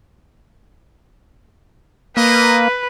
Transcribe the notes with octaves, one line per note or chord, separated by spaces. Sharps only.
A#3 B4 D#5